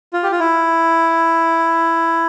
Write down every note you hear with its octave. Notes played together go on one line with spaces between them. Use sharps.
F4
G4
F4
E4